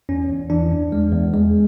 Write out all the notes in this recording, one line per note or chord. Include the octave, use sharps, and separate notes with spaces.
E2 C#4
E2
E3 D4
E2
G#3
E2
G#3